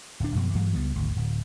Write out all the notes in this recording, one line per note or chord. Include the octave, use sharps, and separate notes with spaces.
D1 D4
F#2 B2 F3
G2 E3 F#3 G#3
C#2 G3 B3
G#1 D2
D1